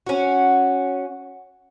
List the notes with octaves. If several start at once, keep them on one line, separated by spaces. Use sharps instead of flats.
C#4 F#4